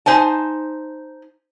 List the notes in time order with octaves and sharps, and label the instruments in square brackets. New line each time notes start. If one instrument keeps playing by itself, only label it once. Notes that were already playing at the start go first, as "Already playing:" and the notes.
[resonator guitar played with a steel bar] D#4 C5 G#5 A5